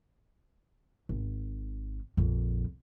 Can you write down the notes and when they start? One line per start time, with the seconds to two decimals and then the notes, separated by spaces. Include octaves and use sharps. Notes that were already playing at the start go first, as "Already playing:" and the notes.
1.09 G#1
2.17 A#1 F2